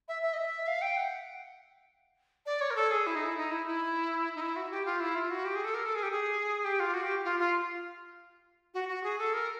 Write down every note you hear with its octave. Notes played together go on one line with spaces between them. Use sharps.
E5
E5
D#5
E5
F5
G5
F#5
D5
C#5
A#4
A4
G#4
E4
D#4
E4
D#4
E4
E4
D#4
E4
F#4
G4
F4
E4
F4
F#4
G4
G#4
A4
A#4
A4
G#4
G4
G#4
G4
F4
F#4
G4
F4
F4
F#4
F#4
G#4
A4
A#4